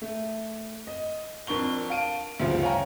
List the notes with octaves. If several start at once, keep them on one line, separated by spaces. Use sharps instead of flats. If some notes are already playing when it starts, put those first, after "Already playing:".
A3
D#5
F2 D4 A#4 C#6 G7
F5 A5 D7 D#7
D2 G2 C#3 F3
C#5 F5 G5 G#5 A#5